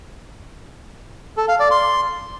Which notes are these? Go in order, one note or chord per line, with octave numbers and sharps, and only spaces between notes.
A4
F5
D5
C6